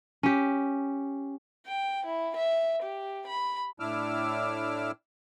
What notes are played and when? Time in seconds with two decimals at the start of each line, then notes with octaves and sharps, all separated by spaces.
0.23 C#4 G4
1.66 G5
2.05 E4
2.36 E5
2.82 G4
3.27 B5
3.80 A2 D4 E4 D6 E6 F6